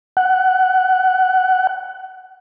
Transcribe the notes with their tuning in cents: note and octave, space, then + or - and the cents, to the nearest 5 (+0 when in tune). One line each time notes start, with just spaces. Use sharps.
F#5 +15